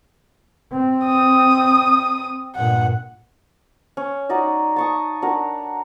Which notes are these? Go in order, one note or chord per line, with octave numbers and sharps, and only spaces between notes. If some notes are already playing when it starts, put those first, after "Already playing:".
C4
D#6
G2 A#2 F#5
C#4
D#4 F#4 D5 D#5
A5 C#6 D#6
D4 F#4 A#4